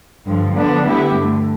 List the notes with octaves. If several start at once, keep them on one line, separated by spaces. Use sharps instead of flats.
G2 D3 F3
D3 F3 B3 D4
D3 G3 B3 E4 G4
G2 D3 A3